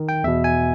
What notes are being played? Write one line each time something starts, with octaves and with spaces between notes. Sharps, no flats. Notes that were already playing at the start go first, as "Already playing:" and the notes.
Already playing: D#3
G5
E2 B2 E5
G#5